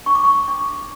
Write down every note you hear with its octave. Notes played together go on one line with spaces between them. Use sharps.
D4 C#6
D6
C#6
D4